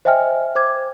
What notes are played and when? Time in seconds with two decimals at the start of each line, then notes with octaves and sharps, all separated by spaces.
0.05 C5 D#5 E5 G5 G#5 F6
0.55 C5 D6 G#6